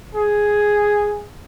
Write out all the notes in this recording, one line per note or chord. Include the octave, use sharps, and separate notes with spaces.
G#4